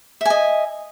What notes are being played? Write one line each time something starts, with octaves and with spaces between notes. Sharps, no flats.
D#5 E5 G#5